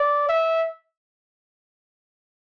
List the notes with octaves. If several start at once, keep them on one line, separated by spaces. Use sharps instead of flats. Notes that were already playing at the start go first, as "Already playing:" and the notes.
Already playing: D5
E5